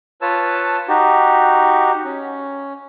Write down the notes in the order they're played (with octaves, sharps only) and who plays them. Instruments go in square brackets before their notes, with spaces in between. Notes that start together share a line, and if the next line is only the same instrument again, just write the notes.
[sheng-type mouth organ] F4 B4 C#5 A5 E6
D#4 F#4 G4
C#4